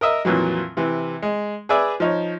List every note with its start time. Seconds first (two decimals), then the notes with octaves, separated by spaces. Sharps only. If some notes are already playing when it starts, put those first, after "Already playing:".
0.01 A#4 D#5 E5
0.25 F2 A#2 E3 F#3
0.77 C3 E3
1.22 G#3
1.69 G#4 B4 D5 E5
2.00 F3 D#4 C#5